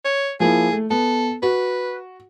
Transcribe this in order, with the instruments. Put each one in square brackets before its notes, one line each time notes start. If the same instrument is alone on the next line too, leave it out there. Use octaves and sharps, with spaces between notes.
[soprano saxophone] C#5
[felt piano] F3 A#3 E4 [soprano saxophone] G#4
[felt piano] A3
[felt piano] B3 [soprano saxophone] A4
[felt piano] F#4 [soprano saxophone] B4